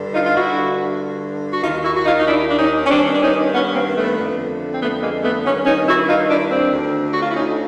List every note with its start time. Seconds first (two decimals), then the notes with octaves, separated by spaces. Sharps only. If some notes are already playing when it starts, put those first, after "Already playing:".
Already playing: G2 D3
0.15 D#4 F4
0.26 F4
0.36 G2 D3 E4 F#4
1.53 F#4
1.63 D#2 D#4 F4
1.68 D#3
1.84 E4 F#4
1.96 F#4
2.06 D#4 F4
2.20 D#4
2.27 D4 E4
2.49 D4
2.59 C#4 D#4
2.86 C#4
2.91 G2 D#3 C4 D4
3.13 D4
3.22 C#4 D#4
3.55 B3 C#4
3.75 A#3 C4
3.97 A3 B3
4.18 F2 D3
4.73 C4
4.82 A3 B3
5.03 G#3 A#3
5.24 A3 B3
5.46 G2 D#3 B3 C#4
5.66 C#4 D#4
5.88 E4 F#4
6.09 D#4 F4
6.30 D4 E4
6.51 C4 D4
6.73 D2 D3
7.13 F#4
7.21 F4
7.29 E4
7.36 C#4 D#4